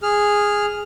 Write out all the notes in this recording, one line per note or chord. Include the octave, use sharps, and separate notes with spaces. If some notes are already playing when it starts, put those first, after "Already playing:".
G#4 F6